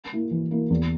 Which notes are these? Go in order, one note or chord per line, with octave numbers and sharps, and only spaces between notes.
A#3 E4
E3
A#3 E4
E2